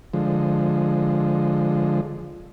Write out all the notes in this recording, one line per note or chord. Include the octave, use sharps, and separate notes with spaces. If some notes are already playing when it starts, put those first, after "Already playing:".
D3 F3 G#3